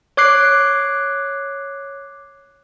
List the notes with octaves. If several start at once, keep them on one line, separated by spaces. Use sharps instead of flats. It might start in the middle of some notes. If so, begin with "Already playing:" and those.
C#5 D6 F#6 C7